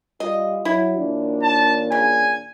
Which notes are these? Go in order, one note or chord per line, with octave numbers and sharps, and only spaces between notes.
G3 F4 D#5
F#3 E4
D#2 A#2 D4
A5
C#3 G#5